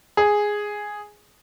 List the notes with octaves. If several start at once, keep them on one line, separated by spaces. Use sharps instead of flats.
G#4